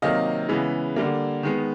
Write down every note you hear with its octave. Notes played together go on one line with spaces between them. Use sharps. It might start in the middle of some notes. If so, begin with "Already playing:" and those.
C3 D#3 F#3 A#3 D#5 F5
C#3 E3 G#3 B3
D3 G3 A#3
D#3 G#3 B3